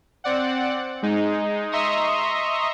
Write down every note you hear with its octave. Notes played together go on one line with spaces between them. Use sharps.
C4 D5 F#5
G#3 D#4
D#5 E5 A#5 C6 C#6 D#6